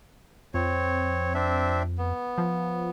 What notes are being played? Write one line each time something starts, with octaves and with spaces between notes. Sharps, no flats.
F2 C4 C#5
C4 D4 E5
B3
F3